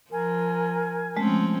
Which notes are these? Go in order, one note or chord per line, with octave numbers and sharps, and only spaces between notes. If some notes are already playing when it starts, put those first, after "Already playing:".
F3 A#4 G#5
F3 G#3 A3 C4 C#4